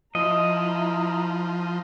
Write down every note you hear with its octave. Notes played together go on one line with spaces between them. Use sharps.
F3 E4 D#5 A#5